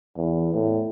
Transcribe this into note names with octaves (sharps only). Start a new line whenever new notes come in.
E2
A2